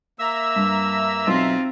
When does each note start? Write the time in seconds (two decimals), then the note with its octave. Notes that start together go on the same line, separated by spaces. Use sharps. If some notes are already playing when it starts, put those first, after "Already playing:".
0.19 A#3 E5 A#5 E6
0.56 G2
1.27 B1 C4 F4